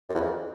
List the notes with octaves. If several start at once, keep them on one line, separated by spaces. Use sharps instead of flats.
F#2
E2
F2